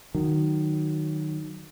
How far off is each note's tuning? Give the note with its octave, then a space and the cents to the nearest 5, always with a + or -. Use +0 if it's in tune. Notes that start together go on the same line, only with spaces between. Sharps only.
D#3 -15 F#3 +0